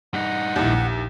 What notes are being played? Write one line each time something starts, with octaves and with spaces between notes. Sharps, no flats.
G2 D#4 F#5
A#1 D#2 E4